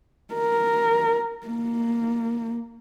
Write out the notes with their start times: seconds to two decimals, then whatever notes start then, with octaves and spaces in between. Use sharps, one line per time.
0.34 A#4
1.47 A#3